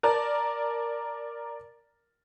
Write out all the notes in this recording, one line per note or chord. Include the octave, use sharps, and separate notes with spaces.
A#4 D5 A5